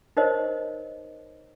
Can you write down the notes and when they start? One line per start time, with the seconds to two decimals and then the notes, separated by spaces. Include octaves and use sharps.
0.17 D#4 A#4 C5 C#5 D#5